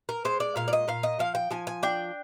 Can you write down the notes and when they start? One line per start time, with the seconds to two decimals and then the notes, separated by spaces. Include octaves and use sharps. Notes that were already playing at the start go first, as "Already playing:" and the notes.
0.09 A#4
0.25 G#3 C5
0.40 D5
0.56 A#2 F5
0.68 D5
0.73 D#5
0.88 A#2 F5
1.03 D#5
1.19 F3 F5
1.35 G5
1.51 F3 G#5
1.67 G#5
1.83 D4 G5